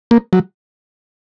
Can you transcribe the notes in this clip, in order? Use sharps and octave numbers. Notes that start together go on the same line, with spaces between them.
A#3
F#3